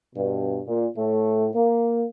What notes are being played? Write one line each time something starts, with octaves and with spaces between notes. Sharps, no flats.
G2 B2
A#2
A2 A3
A#3